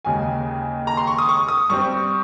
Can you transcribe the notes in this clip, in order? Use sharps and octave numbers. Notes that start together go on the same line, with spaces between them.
D#2 C#3 G#3 G#5
A#5
C6
C#6
D#6
C#6
D#6
G2 G3 C4 C#6